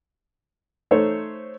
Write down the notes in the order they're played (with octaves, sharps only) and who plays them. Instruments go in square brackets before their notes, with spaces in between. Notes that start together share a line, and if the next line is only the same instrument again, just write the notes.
[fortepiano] A3 D#4 C5 C#5